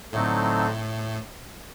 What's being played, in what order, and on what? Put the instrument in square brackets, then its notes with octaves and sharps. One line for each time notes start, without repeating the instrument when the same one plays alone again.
[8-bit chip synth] A2 [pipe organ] D3 F#3 A3 C4 D#4